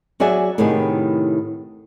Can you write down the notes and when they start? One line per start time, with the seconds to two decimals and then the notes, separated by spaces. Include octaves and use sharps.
0.20 F#3 F#4 G#4 D5 E5 G#5
0.58 A2 C3 D#3 B3 G4 G#4